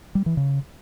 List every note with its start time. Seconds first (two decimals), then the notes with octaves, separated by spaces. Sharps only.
0.15 G3
0.26 E3
0.37 C#3